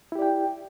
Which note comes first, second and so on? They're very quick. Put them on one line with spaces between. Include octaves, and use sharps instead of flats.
E4 G4 D5 G5